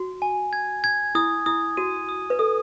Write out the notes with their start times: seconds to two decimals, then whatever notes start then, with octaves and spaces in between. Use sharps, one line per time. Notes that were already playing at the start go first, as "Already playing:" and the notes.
Already playing: F#4
0.22 G#5
0.53 G#6
0.84 G#6
1.15 E4 D#6
1.46 E4 D#6
1.77 F#4 D#7
2.09 D#6
2.30 B4
2.39 A4 D#6